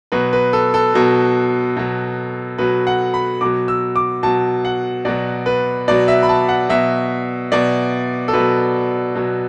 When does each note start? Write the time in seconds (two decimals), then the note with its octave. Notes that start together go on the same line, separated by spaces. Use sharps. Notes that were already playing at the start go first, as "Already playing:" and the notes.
0.12 B2 F#3 B4
0.33 B4
0.53 A4
0.74 A4
0.94 B2 F#3
1.77 B2 F#3
2.58 B2 F#3 B4
2.87 F#5
3.14 B5
3.41 B2 F#3 D6
3.68 E6
3.96 D6
4.23 B2 F#3 A5
4.65 F#5
5.05 B2 F#3 D5
5.46 B4
5.88 B2 F#3 D5
6.08 E5
6.23 B5
6.29 A5
6.49 F#5
6.69 B2 F#3 E5
7.52 B2 F#3 D5
8.28 A4
8.33 B2 B4
8.39 F#3
9.16 B2 F#3